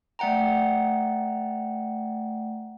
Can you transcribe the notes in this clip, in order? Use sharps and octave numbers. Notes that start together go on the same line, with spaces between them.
A3 D5 F#5 G5 A#5